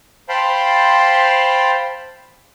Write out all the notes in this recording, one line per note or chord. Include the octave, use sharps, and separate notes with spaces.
C5 F5 G5 A5 B5 C6